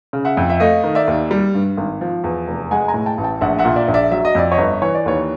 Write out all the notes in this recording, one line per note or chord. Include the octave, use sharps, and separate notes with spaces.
C#3
E5 F#5
F2
E5
A3 D#5 F5
D#3
D5 E5
D#2
G3
G2
G#1
F3
E2
F1
G#3 F#5 G#5
G#5 A#5
A2
G5 A5
A1
G5 A5
A#1 E5 F#5
E5 F#5
A#2
D5 E5
A#1
D5 E5
F#3 E5
D#5
F2 D5
C#5 D#5
G1
E3 C#5
D5
D#2 B4 C#5